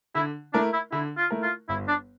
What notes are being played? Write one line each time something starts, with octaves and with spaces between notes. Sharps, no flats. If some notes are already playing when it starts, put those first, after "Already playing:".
D3 E4
A3 D4 E4 A#4
E4
D3 E4
F4
A3 E4 A#4
F4
G1 E4
D4